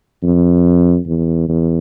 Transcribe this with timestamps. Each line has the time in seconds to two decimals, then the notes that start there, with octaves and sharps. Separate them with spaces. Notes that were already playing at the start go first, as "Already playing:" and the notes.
0.23 F2
1.06 E2
1.48 E2